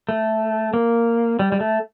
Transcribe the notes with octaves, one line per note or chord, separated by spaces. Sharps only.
A3
A#3
G3
G3
A3